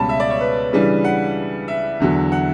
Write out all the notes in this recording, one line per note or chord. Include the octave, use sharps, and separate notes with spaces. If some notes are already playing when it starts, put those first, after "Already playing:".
Already playing: C#2 B2 G3 C#4 A5 B5
E5
D5
C#5
B4
C#3 E3 G3 D4
F#5
E5
E2 D3 F#3
F#5